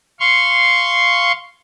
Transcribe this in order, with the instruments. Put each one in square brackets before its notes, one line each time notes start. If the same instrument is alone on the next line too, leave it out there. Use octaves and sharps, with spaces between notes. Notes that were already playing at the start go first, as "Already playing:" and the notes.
[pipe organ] F5 C6 C#6